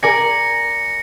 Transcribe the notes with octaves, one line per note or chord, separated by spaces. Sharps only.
A#4 D5 G#5 A#6 C#7